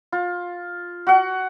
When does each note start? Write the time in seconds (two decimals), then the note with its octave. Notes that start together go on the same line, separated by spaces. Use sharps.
0.12 F4
1.07 F#4 F#5